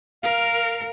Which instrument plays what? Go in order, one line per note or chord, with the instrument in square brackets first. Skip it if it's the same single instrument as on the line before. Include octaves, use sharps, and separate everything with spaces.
[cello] A#4 [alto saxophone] F5